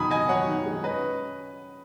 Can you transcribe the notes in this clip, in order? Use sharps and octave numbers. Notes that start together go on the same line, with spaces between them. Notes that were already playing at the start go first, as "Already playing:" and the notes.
Already playing: F#2 B2 D#3 G#5 B5 D#6
D#3 D#5 G#5
F#2 C#5 F#5
D#3
G#3
C#4 B4 D#5